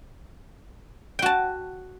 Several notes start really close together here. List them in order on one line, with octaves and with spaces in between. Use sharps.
G5 F#4 A5